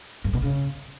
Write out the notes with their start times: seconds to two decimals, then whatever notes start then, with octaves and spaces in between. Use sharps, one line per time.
0.24 G2
0.33 B2
0.42 C#3